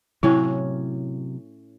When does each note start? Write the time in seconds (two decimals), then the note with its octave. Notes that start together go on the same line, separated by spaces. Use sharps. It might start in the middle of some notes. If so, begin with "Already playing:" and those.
0.23 A2 C3 F#3 C#4 E4 F5